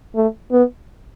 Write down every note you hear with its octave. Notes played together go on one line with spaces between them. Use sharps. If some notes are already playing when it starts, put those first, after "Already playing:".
A3
B3